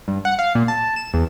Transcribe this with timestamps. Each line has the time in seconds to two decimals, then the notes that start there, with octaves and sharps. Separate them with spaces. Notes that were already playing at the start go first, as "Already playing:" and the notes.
0.08 G2
0.25 F#5
0.39 F5
0.55 A#2
0.68 A5
0.96 E7
1.14 E2